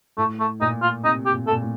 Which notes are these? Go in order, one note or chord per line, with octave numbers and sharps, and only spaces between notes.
A2 A3
A3
A#2 D#4
F4
C3 D#4
G4
A#2
A4
A#2
A2